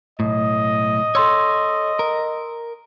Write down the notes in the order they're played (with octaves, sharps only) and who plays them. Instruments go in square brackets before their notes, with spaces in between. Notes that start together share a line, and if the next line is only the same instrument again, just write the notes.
[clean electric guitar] B1 A2 [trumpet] D#5
[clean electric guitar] A4 C#5 [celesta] C6 E6
[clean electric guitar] A#4